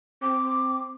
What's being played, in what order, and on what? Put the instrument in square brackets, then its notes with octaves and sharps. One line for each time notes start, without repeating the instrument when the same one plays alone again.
[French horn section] C4 [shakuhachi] D6